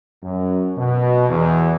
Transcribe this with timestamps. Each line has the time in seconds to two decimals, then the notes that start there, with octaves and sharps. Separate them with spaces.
0.22 F#2
0.76 B2
1.29 E2